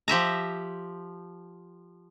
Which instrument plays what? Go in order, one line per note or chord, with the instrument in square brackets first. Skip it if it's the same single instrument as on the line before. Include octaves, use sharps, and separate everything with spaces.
[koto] F3 G4 E5 A#5